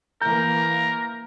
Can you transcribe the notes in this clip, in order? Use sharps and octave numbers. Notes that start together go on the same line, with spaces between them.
E3 A#3 A#4 A#5 G6